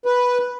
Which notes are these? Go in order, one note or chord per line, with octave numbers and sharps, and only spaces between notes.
B4